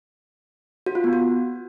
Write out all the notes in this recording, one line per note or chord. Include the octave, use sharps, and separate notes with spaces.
F#4
F4
B3
F#4